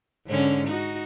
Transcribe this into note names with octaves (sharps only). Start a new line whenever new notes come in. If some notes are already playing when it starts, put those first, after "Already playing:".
G#2 D3 C#4
D#4 F#4